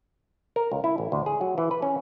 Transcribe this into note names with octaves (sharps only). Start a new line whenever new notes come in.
A#4
C#2
E4
A1
D2
G#4
F#3
E3
B4
C#4